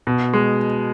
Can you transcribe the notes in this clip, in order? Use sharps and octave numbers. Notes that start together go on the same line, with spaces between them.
B2
G#3